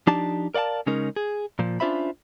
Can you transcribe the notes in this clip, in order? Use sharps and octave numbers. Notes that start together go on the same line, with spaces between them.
F3 D4 D#4 G4 A5
A#4 D5 F5 F#5 A5
C#3 G#3 C#4 D#4 A#4
G#4
A#2 F3
C#4 D4 F4 C5 E5 B5